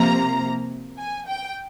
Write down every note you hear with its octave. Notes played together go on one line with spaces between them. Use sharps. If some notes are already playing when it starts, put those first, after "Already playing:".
Already playing: C3 F3 A#3 A#5
G#5
G5